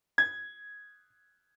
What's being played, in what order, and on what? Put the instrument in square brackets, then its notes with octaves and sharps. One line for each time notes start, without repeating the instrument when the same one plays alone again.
[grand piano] G#6